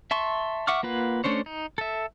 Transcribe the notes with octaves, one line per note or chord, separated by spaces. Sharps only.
E5 A5 C6 C#6
E5 F#5 C#6 D6 F6
A#3 F4 B4 F#5
A3 C#4 D4 C5 C#5
D#4
A4 E5